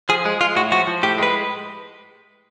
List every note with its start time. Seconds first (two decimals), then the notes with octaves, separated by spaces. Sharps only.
0.09 F3 G#4
0.25 G#3
0.41 G#3 F4
0.56 A2 F#4
0.72 F3 F#4
0.87 F3
1.03 A2 G4
1.18 G#3 B4